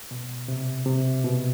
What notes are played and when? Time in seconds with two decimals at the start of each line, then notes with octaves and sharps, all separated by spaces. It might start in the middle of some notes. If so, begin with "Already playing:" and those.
0.11 B2
0.48 C3
0.86 C3
1.24 B2